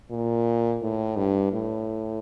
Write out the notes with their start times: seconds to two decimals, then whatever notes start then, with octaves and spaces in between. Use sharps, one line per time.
0.11 A#2
0.82 A2
1.17 G2
1.53 A2